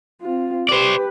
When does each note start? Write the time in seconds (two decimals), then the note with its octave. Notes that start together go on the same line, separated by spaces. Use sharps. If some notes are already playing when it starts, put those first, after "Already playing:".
0.22 C4 F4
0.69 G4 B4 C5 D5